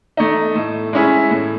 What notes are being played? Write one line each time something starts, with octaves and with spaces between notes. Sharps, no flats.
A3 D#4
A2
G#3 C#4 E4 G#4
A2